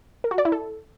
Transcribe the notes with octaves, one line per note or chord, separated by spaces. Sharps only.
A#4
F#4
D5
E4
A4